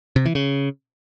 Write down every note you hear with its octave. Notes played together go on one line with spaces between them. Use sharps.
C3
E3
C#3